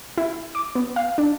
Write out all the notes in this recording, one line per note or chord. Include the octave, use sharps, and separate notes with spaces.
E4
D6
B3
F5
D4